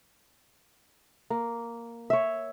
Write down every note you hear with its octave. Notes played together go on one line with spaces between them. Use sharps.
A#3
C#5 E5